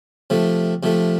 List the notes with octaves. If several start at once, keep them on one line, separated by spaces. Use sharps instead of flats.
C3 F3 A3
C3 F3 A3